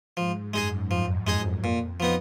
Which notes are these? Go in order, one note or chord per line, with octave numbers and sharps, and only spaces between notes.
G#2 F3
F#2 G#3 D#4 G#4
F2 F3
F#2 G#3 D#4 G#4
F2 A#2
F3 B3 D#4